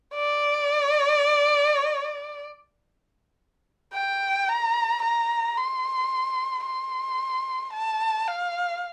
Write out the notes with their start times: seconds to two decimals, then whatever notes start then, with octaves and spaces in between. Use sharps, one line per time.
0.15 D5
3.94 G5
4.49 A#5
5.02 A#5
5.57 C6
6.66 C6
7.73 A5
8.28 F5